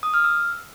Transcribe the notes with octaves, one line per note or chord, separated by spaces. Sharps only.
D#6
F6
E6